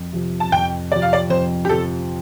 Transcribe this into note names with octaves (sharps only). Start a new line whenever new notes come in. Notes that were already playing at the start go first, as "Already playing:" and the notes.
Already playing: F2
C3 F3
A5
F2 G5
C3 F3 D5
F5
D5
F2 C5
G4
C3 F3 A4